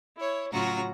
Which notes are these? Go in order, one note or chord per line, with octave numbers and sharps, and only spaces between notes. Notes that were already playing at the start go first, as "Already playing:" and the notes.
E4 C#5
A2 C#3 F#3 F4 F#4 A#5